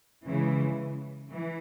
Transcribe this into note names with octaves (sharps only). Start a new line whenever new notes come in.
C#3 E3 G#3
E3